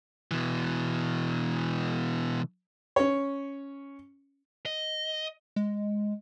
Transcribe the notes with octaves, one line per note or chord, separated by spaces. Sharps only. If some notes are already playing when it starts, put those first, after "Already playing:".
B2 E3
C#4 C#5
D#5
G#3